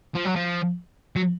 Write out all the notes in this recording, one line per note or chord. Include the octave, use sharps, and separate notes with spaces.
F3
F#3
F3
F#3